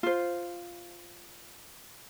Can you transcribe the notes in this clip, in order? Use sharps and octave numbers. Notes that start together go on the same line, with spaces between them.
F4 C5